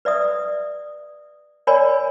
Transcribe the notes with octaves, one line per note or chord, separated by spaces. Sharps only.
B4 D5 E5 D#6
A#4 C#5 D5 G#5 B5